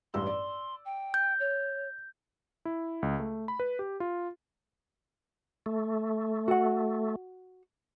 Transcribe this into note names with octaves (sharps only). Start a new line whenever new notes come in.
A1 G2 C6 E6
D5
G5
G6
C#5
E4
C#2
A3
B5
B4
G4
F4
A3
F#4 F#5